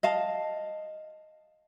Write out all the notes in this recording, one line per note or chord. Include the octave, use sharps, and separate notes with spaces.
D#5 F5 A5